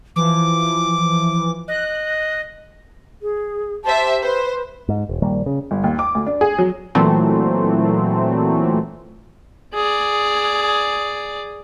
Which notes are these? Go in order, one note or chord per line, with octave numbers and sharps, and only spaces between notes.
E3 F3 D6
D#5 F#6
G#4
G4 C5 E5 A5
B4 C5
G#2
E1
A#1 D#3 G3 A#3
C#3
G1
D#2
D6
D2
D4
G#4
F#3
A#2 E3 F#3 A3 C4
G#4 D5